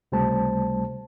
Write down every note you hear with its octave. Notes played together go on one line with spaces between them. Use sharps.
C#2 C3 G3 A3 C5 A5